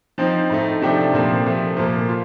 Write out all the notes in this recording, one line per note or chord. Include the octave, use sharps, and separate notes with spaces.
F3 C4 D#4
A2 A3 D#4
C3 F3 A3 D4 G4
A#2 F3 C4
C3 F3 A3
A#2 F3 A#3
F4